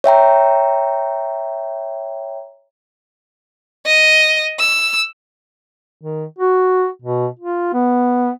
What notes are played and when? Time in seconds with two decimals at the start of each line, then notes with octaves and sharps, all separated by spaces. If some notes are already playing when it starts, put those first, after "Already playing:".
0.04 C#5 E5 G5 A#5
3.86 D#5
4.59 E6
6.01 D#3
6.39 F#4
7.02 B2
7.39 F4
7.73 B3